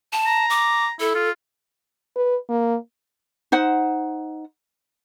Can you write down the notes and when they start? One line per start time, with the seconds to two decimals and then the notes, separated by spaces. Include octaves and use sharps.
0.13 A5
0.26 A#5
0.50 D6
1.00 E4 A4
1.15 F4
2.16 B4
2.49 A#3
3.52 D#4 C5 F#5